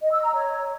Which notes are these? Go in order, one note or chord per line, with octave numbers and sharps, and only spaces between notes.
D#5
E6
A#5
C#5